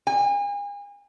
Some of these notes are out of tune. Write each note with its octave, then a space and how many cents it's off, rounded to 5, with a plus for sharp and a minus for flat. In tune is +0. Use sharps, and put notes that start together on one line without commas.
G#5 -40